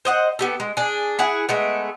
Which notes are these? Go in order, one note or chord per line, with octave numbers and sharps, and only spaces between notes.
C5 D#5 F#5
B3 G4 A4
G#3
D4 G#4
E4 G#4 F#5
G#3 A3 B3